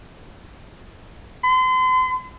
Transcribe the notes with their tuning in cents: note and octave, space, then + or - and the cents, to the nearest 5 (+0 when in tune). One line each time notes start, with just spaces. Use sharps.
C6 -40